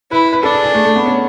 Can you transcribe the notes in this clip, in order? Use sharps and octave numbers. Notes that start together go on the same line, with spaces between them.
E4 B4
B4
D4 A4
G#4
G#4
A3
A3
B3
C#4